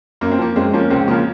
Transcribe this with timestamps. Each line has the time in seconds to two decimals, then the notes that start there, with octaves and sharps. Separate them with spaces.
0.21 F#2 A#3
0.32 C4
0.39 F3 A#3
0.56 F#2 G#3 C4
0.73 F3 A#3 C#4
0.90 C#2 G#3 C4
1.08 C#3 A#3
1.11 F3